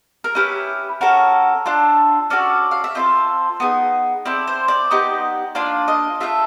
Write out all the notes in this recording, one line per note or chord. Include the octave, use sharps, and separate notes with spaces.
A#4
C#4 E4 G4 B4
C#4 F#4 A4 A#4
D4 F4 A4
C#4 F#4 A4 D5
F5
E5
C4 F4 A4 D#5
B3 D#4 G#4
C4 E4 A4 D5
C5
D5
B3 D#4 G4
A#3 D4 F4 D5
D#5
A3 D4 F4 A4 E5